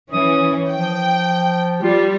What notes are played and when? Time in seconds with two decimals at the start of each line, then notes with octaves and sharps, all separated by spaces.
0.12 E3 C#4 D#6
0.72 F3 G5
1.83 G3 F4